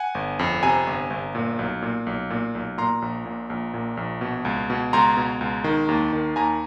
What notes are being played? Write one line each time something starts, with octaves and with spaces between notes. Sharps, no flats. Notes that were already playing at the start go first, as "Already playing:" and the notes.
Already playing: F#5 G#5
G1
F2
C3 G#5 A#5
G1
G1
A#2
B1
A#2
B1
A#2
B1
A#2 A#5 C6
A#1
A#2
A#1
A#2
A#1
B2
C#2
B2
C#2 A#5 C6
B2
C#2
D#3
D#2
D#3
D#2 G#5 A#5